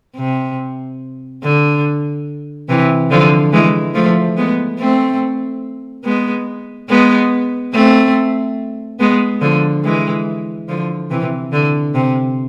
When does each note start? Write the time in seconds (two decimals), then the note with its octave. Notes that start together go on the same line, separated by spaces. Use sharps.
0.16 C3
1.43 D3
2.69 C3 E3
3.10 D3 F3
3.52 E3 G#3
3.94 F3 A3
4.37 G#3 B3
4.79 A3 C4
6.05 G#3 B3
6.89 G#3 B3
7.73 A3 C4
8.99 G#3 B3
9.41 D3 F3
9.84 E3 G#3
10.68 D3 F3
11.11 C3 E3
11.53 D3
11.95 C3